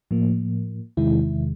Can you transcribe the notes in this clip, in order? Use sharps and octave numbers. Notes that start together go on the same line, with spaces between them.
A2 F3 A#3
E2 C3 D#3 G#3 E4